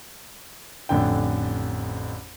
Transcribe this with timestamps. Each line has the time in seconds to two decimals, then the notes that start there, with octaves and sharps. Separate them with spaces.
0.89 A1 F2 D3 G5